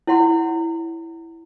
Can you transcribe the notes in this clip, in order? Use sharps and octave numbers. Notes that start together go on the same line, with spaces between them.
E4 C#5 F#5 C6